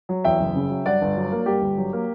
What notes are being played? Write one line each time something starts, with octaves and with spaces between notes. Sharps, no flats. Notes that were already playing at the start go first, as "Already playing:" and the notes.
F#3
E2 E5 G5
F#1
C#3
F#3
G2 D5 F#5
G1
F#3
A#3
G2 G4
G1
F#3
A#3